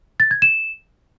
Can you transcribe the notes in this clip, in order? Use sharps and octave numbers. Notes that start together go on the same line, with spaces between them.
A6
G#6
E7